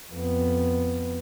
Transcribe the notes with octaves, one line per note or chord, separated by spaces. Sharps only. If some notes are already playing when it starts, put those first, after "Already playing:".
F2 B3